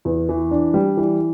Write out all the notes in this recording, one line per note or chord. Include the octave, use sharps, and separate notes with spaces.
E2
E3
D4
G3
E3